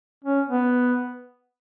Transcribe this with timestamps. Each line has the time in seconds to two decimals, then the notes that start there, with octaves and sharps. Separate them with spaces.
0.25 C#4
0.48 B3